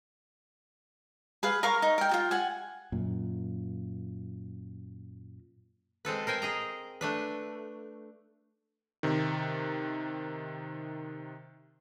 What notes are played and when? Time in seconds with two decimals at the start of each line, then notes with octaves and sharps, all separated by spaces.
1.43 G#4 B4 F5
1.63 A#4 F5 A#5 C#6
1.82 D#4
1.98 A#4 G5
2.09 F4 F#4 G5
2.31 F#5 G#5
2.92 F#2 A#2
6.05 G#3 C4 A4 B4
6.27 A#4 C5 G5 G#5
6.42 G#4 D#5 A#5
7.01 A3 D4 B4
9.03 C3 D#3